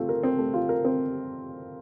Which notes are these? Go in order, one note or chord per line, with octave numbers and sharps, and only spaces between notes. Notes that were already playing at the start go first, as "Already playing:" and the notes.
Already playing: A3 C4 F4
A#4
C4
A3
F4
A#4
C4